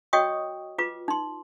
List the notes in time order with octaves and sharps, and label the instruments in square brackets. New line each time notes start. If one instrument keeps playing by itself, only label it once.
[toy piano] F#4 C#5 D#5 G5 C#6 D#6
F4 B4 D6
D#4 C6